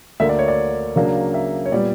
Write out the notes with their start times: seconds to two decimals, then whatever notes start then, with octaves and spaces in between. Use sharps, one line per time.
0.20 D2 D3 A#3 D4 E5
0.29 D5
0.39 C#5
0.48 D5
0.96 C#3 F#3 A#3 D4
1.34 E5
1.66 C#5
1.72 A#2 G3 B3 D5